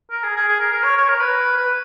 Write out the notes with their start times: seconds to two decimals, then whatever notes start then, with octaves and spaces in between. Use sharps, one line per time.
0.11 A#4
0.23 G#4
0.36 G#4
0.48 G#4
0.60 A#4
0.72 A#4
0.84 C#5
0.97 C#5
1.08 A#4
1.20 B4
1.57 B4